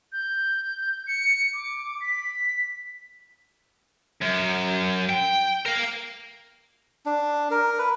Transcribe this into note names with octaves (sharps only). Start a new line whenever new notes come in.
G6
C#7
D6
B6
F#2
G5
A#4 F5
D4
A#4
B4